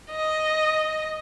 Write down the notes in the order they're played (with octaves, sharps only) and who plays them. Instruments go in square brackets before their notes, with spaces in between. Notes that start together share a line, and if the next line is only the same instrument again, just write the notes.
[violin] D#5